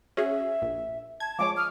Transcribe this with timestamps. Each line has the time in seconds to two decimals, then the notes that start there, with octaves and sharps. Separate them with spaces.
0.17 C#4 F#4 G#4 E5
0.62 A#1
1.20 A5 G#6
1.39 F3 G#3 C#5 D6
1.57 D#6 F6